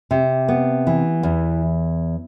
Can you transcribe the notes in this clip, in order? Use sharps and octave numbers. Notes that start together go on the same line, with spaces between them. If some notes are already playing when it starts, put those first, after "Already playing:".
C3
B3
E3
E2